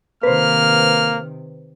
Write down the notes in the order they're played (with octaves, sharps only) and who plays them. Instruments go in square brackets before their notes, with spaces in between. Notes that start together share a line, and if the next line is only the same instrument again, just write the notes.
[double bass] C3 D#3 [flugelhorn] A#3 [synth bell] B4 C5 [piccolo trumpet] F6